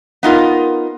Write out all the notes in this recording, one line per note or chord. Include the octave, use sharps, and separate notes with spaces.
B3 D#4 F4 A#4